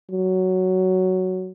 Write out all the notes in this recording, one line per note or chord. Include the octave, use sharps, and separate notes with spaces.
F#3